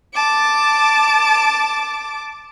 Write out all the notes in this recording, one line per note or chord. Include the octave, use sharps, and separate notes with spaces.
A5 D6